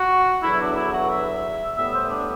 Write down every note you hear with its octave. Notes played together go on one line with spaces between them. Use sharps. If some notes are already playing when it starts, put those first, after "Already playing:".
Already playing: F#4
E2 D3 F#3 B3 E4
D4
E4
F#4
E5
A2 G3 B3 E5
C5
D4